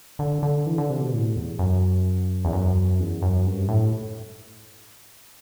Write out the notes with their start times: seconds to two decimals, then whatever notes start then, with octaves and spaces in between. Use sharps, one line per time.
0.19 D3
0.43 D3
0.66 E3
0.78 D3
0.90 C3
1.01 B2
1.13 A2
1.36 E2
1.59 F#2
2.45 E2
2.53 F#2
2.99 E2
3.22 F#2
3.46 G2
3.68 A2